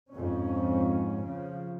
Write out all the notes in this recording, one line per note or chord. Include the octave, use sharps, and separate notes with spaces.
F2 G#2 C#4
C#3 F3